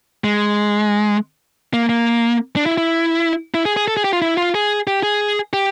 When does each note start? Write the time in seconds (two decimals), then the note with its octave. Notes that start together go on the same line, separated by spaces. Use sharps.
0.24 G#3
1.73 A#3
1.89 A#3
2.56 D4
2.66 E4
2.77 E4
3.54 E4
3.65 G#4
3.76 G#4
3.88 A4
3.97 G#4
4.04 G4
4.13 F4
4.22 E4
4.37 F4
4.55 G#4
4.87 G4
5.03 G#4
5.53 G4